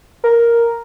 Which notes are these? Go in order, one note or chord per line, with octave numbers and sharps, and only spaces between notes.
A#4